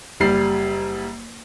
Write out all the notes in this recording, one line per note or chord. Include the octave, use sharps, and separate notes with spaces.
F#1 G3 C7